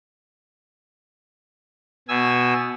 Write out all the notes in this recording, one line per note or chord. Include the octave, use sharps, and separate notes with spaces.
B2 G#5 E6